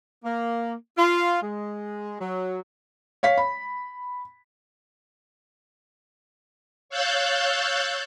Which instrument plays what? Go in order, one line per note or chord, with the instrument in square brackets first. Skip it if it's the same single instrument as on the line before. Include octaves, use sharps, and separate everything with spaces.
[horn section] A#3
F4
G#3
F#3
[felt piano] C#5 F5 B6
B5
[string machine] C#5 F5 E6 F#6 G6 A6